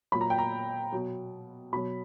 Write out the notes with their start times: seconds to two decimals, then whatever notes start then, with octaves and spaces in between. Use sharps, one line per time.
0.12 A#2 F#3 B5
0.21 A#5
0.30 G5
0.38 A#5
0.92 B2 F#3
1.73 B2 F#3 B5